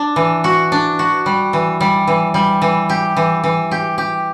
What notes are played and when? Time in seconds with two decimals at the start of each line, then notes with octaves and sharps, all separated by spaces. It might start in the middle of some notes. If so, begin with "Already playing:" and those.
Already playing: D4
0.16 E3
0.44 F#4
0.72 D4
0.99 F#4
1.26 G3
1.53 E3
1.81 G3
2.07 E3
2.34 G3
2.62 E3
2.89 G4
3.17 E3
3.44 E3
3.71 G4
3.98 G4